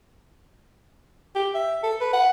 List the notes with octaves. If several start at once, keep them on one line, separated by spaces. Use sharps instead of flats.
G4
E5
A4
B4
F#5